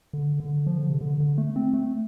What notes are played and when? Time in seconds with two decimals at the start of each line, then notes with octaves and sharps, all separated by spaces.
0.13 D3
0.40 D3
0.67 F3
0.78 D3
0.90 C3
1.01 D3
1.20 D3
1.38 A3
1.56 C4
1.73 A3